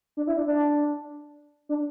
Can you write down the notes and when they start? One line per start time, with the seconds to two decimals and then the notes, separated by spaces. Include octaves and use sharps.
0.17 D4
0.27 E4
0.37 D4
0.47 D4
1.69 D4